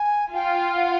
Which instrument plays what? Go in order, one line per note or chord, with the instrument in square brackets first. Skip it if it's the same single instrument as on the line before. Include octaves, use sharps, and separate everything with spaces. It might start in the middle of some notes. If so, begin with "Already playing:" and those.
Already playing: [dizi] G#5
[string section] F4 [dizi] G5
[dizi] F#5